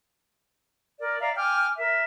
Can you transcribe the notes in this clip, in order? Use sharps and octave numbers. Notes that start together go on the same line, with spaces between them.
A#4 D5
D5 E5 F5 A#5
G5 G#5 D6 F6
A#4 E5